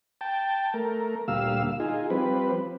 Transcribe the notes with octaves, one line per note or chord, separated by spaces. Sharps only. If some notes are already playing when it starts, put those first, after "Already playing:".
G5 A5
A3 A#4
D2 A#2 G3 F5 E6
D#4 F4 G#4
F3 G3 C4 B4